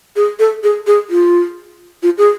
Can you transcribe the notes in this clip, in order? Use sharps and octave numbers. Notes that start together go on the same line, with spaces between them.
G#4
A4
G#4
G#4
F4
F4
G#4